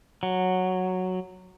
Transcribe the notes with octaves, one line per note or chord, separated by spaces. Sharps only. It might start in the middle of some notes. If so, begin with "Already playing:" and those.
F#3